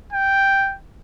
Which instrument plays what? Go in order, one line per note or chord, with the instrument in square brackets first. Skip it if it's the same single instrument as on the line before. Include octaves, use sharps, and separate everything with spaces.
[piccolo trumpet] G5